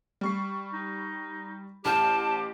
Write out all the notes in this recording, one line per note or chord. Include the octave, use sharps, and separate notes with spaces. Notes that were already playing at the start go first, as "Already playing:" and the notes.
G3 C#6 C7
D#4
A1 G4 A5 F6 G6